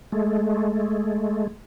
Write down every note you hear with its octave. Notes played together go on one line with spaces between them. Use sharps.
G#3 A3